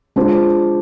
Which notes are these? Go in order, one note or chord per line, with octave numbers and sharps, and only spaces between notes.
G#3 D4 F4 C5